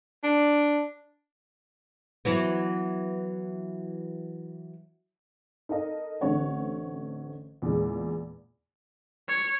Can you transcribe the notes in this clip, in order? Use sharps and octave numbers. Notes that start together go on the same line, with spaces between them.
D4
E3 F#3 B3
D#4 A4 A#4 D#5
A1 D3 C4 C#5 F#5
E2 A#2 C#3 G#3
C#5